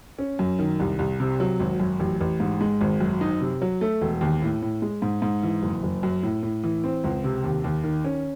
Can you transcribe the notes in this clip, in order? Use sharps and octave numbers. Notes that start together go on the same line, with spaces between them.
C#4
F#2
D#3
C2
C2
C3
F#3
G#1
F#2
A1
A1
G#2
G#3
G#1
F#2
D#4
C3
F#3
A3
E1
D#2
A2
A2
G#3
G#2
G#2
E3
F#1
F#1
F#2
A2
A2
E3
C4
C#2
C3
D#2
D#2
D#3
C#4